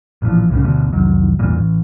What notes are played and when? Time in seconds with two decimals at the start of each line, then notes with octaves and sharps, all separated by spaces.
0.22 A1 A#2 E3 F3
0.49 C2 A2 C#3
0.64 G1 D2 B2
0.92 F1 C2 D#3 F#3
1.39 E1 A1 G2 A#2
1.55 A1